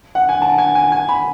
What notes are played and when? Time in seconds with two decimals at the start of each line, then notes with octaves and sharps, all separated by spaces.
0.15 F#5
0.29 G#5
0.42 A5
0.58 G#5
0.75 G#5
0.92 G#5
1.09 B5